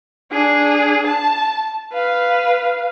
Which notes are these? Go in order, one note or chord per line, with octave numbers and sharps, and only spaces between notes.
D4 G#4
A5
B4 F5